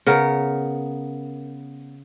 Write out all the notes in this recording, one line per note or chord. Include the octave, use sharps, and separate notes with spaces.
C#3 B3 A#4